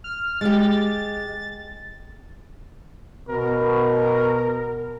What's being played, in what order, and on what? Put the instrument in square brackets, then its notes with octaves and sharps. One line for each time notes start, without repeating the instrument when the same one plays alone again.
[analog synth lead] F6
[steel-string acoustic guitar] G#3 G4 [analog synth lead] A6
[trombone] B2 [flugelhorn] A#4